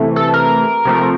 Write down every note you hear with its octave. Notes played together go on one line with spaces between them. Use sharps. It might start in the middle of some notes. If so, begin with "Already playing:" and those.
Already playing: C3 E3 A3
A4
A#4
C3 F3 A3